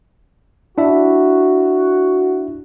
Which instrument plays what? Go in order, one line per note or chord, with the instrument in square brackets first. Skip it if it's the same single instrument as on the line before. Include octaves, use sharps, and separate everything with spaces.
[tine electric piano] D4 E4 E5 [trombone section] F#4